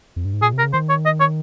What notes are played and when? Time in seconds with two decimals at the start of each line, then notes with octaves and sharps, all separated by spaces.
0.16 F2
0.25 G2
0.33 G#2
0.42 A#2 G#4
0.53 C3
0.59 A#4
0.63 C#3
0.73 D#3 C5
0.89 C#5
1.05 D#5
1.20 C#5